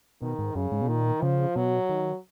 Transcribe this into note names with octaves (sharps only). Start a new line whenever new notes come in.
B2 D#3
G#2
F#2 C#3
G#2
B2
A#2 D#3
C#3 F3
B2 F#3
D#3